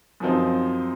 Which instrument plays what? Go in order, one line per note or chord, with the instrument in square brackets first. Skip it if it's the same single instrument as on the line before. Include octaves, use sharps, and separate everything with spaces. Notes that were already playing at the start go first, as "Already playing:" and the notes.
[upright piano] F#2 F3 C4 D#4